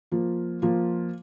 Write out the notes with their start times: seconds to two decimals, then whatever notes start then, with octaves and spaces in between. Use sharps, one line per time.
0.12 F3 A#3 F4
0.62 F3 A#3 F4